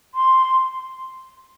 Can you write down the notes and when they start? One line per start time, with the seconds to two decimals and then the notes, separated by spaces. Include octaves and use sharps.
0.15 C6